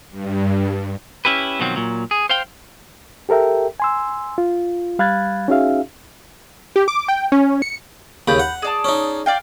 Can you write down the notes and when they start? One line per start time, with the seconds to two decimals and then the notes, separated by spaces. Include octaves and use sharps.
0.11 G2
1.25 C#4 E4 G4 B4
1.60 B2 D#3 F3 F#3 C4
1.76 A#2 F#3
2.11 G#4
2.30 C5 F5 G5
3.29 G4 A4 A#4 E5 G5
3.80 G#5 C6 E6
4.38 F4
4.99 G3 F5 B5 F#6 G#6 A6
5.48 C#4 D#4 F#4 G#4 E5 F5
6.76 G4
6.88 D6
7.08 G5
7.32 C#4
7.62 C#7
8.28 D#2 C#3 B5 G6
8.40 F#5
8.62 G#4 D5 A5
8.85 C#4 D#4
9.26 D5 F5 G5